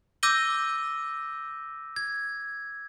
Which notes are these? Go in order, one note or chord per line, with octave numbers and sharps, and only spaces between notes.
D6 E6 G6 A#6 D#7 G7
G#6